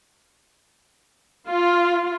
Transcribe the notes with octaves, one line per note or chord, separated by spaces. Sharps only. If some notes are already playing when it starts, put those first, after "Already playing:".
F4